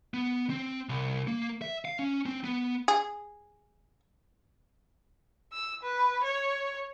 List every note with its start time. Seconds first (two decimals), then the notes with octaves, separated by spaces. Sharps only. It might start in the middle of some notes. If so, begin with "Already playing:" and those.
0.14 B3
0.50 C4
0.89 C2
1.27 A#3
1.62 E5
1.85 F5
1.99 C#4
2.26 C4
2.44 B3
2.88 G#4
5.53 E6
5.83 B4
6.23 C#5